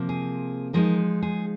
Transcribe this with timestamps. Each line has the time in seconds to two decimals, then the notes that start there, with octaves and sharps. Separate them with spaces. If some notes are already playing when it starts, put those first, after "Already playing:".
Already playing: C3 F3 A#3
0.09 G#4
0.74 F3 G#3 D#4 A#4
1.22 G#4